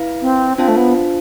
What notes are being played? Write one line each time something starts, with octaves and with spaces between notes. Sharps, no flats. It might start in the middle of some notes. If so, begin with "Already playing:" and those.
Already playing: E4 B4 F5
C4
C4 D4 F4 C5 F5 A5
A3
B3